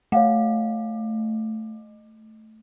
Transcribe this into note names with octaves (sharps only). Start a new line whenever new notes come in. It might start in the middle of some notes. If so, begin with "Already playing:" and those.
A3 C#5 F5 F#5